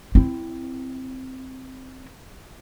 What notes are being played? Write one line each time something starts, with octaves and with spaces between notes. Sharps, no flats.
C4 E4